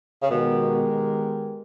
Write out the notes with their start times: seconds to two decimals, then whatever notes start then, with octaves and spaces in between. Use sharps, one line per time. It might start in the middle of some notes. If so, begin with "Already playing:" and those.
0.22 C#3
0.29 B2 D#3 G#3 B3 G4 A#4